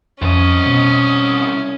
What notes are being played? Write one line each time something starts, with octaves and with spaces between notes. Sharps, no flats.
C2 F2 F3 C#4 D#5
B2